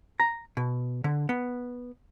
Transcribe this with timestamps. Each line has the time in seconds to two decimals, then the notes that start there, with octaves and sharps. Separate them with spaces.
0.20 A#5
0.57 B2
1.04 D3
1.29 B3